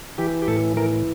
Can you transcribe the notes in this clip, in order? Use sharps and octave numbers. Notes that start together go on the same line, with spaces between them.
E3 G4
G4
A2 A4
E3 A#4